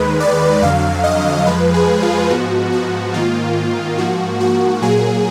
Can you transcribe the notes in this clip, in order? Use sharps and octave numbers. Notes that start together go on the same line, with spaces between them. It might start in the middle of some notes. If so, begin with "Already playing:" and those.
Already playing: D#2 D#3 G#3 B4
D5
F2 D3 F#3 F5
D#5
F2 F3 G#3 B4
G#4
F4
G#2 F3 B3 F#4
F#4
G#2 D#3 A#3 F4
G#2 F3 A#3 F#4
F#4
A#2 F#3 A#3 G#4